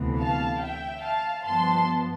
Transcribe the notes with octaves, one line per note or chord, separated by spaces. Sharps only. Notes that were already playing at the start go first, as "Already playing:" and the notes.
Already playing: D2 C3 E3 B3
F5 A5
E5 G5
F5 A5
G2 F3 B3 A5 C6